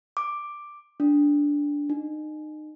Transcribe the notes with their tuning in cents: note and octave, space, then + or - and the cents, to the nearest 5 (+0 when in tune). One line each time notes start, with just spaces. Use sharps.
D6 +5
D4 -10
D#4 -30